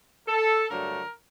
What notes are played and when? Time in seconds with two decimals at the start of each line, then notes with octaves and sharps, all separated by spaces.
0.27 A4
0.70 G2 D3 F#3 A3 A#4